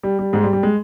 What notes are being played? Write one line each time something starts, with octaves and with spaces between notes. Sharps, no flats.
G3
G3
G#2 G#3
G3
G3
G#3